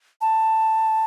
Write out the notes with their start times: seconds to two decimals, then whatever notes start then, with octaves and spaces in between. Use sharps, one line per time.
0.21 A5